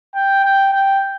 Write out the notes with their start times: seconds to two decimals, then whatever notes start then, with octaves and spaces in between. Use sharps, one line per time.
0.15 G5
0.44 G5
0.73 G5